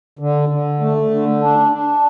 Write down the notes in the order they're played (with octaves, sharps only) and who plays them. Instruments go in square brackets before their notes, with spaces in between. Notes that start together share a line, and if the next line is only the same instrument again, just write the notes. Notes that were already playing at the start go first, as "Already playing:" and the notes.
[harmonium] D3
D3
A3
D3
D4
D4